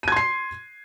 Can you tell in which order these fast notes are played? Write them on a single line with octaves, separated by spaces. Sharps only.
D#7 G#6 C6 C7